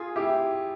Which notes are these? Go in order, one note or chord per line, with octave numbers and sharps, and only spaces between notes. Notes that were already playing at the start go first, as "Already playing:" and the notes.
Already playing: F4 G#4
E4 G4